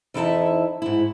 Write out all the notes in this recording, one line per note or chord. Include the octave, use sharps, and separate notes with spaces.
F2 E3 D#4 E4 E5 A5
G#2 E4